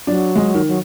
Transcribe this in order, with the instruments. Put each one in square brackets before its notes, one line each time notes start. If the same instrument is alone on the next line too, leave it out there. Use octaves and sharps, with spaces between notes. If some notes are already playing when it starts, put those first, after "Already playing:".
[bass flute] F#3 [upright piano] D4
[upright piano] G#3
D#3
[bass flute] F#3